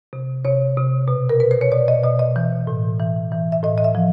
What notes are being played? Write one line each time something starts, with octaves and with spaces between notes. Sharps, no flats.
C3
C3 C#5
C3
B2
A#4
B2 B4
C5
C#5
B2 D5
D#5
B2 D#5
D#5
E3
A2
E3
E3
E5
A2 D#5
D#5
E5
F3